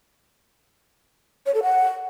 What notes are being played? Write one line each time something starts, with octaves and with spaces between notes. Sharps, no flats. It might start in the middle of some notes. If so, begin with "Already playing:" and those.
C#5
A4
F#5